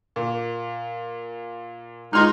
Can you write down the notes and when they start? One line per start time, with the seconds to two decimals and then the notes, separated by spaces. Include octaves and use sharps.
0.16 A#2
2.13 C#2 D#4 G#4 C6 F6